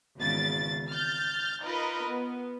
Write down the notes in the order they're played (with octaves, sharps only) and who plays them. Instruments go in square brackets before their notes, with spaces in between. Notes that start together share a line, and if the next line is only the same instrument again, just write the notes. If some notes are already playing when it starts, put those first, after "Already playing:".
[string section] G#1 E2 C#3 A6
F6 G6 A6
D#4 F4 A#4 B4 D#5
B3